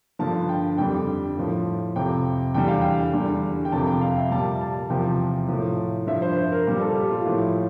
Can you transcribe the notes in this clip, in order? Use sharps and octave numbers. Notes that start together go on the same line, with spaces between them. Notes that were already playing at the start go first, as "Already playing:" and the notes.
G2 D3 F3 A5
G5
F2 D3 G3 G5
A2 F3
F2 C3 F3 G5
E2 D3 G3 G5
F5
G5
E2 D3 G3
G5
F2 C3 F3 A5
G5
F5
E5
A#2 G3 A5
A5
E2 C3 F3 G5
A2 F3
G2 F3 E5
C5
C5
A#4
A#2 G3
A4
G4
F4
F4
A2 F3 E4